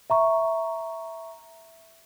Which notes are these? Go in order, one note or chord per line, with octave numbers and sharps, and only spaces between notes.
E5 A#5 C#6